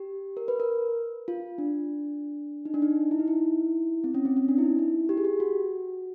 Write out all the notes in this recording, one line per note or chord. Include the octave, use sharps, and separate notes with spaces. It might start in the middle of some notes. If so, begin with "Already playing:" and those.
Already playing: G4
A#4
B4
A#4
F4
D4
D#4
D4
D#4
E4
D#4
E4
C4
C#4
C4
C#4
D4
E4
D#4
E4
G4
G#4
G4
F#4